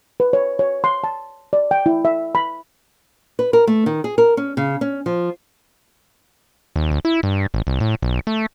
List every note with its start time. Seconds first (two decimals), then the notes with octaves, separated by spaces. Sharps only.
0.20 B4
0.33 C#5
0.59 C#5
0.84 C6
1.04 A5
1.53 D5
1.71 G5
1.86 E4
2.05 E5
2.35 B5
3.39 B4
3.53 A#4
3.67 A3
3.86 D#3
4.04 G#4
4.18 A#4
4.37 C#4
4.57 C#3
4.81 C#4
5.06 F3
6.76 D#2
6.91 D2
7.05 E4
7.23 G2
7.54 A1
7.67 C2
7.80 A2
8.02 B1
8.27 A3